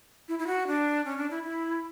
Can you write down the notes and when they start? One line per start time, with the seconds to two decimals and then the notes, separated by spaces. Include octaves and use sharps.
0.28 E4
0.39 E4
0.47 F#4
0.67 D4
1.05 C#4
1.18 D4
1.30 E4
1.43 E4